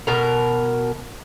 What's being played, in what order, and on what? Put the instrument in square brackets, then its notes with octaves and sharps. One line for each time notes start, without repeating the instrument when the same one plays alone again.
[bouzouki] B2 A#4